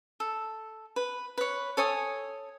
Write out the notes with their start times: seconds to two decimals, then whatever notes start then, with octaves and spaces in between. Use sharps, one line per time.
0.20 A4
0.96 B4
1.37 B4 C#5
1.77 A4 C#5 G#5 D#6